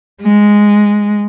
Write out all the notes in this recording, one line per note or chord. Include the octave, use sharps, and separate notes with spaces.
G#3